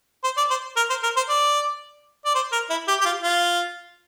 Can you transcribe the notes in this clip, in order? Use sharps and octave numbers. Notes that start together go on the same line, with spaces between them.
C5
D5
C5
A#4
C5
A#4
C5
D5
D5
C5
A#4
E4
G4
G4
F4
F4